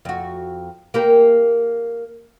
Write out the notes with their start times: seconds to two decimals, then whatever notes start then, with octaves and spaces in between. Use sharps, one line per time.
0.05 F2 F#4
0.94 A#3 G4 A#4